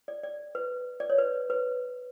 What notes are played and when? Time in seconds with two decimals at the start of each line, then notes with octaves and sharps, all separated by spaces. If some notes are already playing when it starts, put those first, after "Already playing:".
0.08 D5
0.24 D5
0.55 B4
1.00 D5
1.10 C#5
1.18 B4
1.50 B4